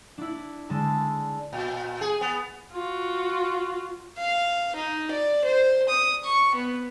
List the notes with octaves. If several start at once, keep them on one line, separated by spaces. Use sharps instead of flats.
D4 E4
D3 G#3 A5
A#2
G#4
B3
F4 F#4
F5
D#4
D5
C5
D#6
C#6
B3